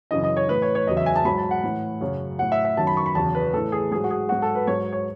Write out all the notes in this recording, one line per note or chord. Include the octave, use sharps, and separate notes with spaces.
F#2 C#3 E3 D#5
D#5
C#5
A2 E3 B4
C#5
C#5
E2 C#3 F#3 D#5
E5
G#5
A5
G#2 F#3 B5
A5
F#5
A2 E3
F#2 C#3 F#3
A2 F#3 F#5
E5
E5
F#2 D#3 F#3 A5
B5
C#6
B5
E2 C#3 F#3 A5
B4
A2 E3 A4
G#4
G#2 F#3 G#4
F#4
G#4
G#2 F#3 F#4
A4
B4
G#2 F#3 C#5
C#5